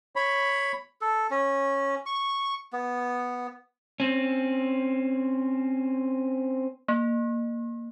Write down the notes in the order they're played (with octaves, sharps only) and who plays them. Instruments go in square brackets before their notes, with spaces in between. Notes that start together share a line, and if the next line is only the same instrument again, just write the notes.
[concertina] C#5 B5
[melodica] A4
C#4
C#6
B3
[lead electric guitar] C4 C#4
[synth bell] A#3